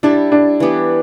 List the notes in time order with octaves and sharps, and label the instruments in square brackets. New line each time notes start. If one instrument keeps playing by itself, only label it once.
[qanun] G3 E4 A4 [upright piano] D4
[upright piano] D4
[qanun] E3 B3 G4